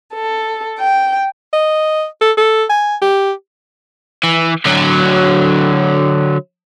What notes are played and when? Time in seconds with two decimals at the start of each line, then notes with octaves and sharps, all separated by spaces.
0.13 A4
0.79 G5
1.53 D#5
2.21 A4
2.37 A4
2.70 G#5
3.02 G4
4.23 E3
4.65 D3 F#3